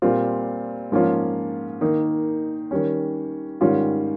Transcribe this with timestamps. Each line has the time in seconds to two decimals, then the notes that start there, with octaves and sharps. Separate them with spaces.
0.02 A#2 G3 C4 F4
0.92 G#2 F3 A#3 C#4 F4
1.81 D#3 A#3 D#4
2.71 D#3 G3 C#4
3.61 G#2 D#3 G3 C#4 F4